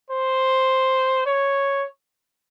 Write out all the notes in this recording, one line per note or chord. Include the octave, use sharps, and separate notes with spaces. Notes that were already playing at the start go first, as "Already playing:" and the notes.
C5
C#5